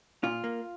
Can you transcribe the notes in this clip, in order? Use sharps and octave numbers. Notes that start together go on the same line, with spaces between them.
A#2 F4
A#3